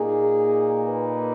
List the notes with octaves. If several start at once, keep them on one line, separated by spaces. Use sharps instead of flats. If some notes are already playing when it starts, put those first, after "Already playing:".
Already playing: A#2 A#3 D#4 G#4
B4